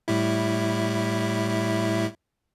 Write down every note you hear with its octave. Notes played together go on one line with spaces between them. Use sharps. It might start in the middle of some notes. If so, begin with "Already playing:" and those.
A2 G3 E4